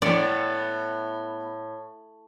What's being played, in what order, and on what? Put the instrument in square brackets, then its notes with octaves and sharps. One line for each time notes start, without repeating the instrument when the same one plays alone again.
[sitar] A2 [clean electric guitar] B3 A4 F#5 [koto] D5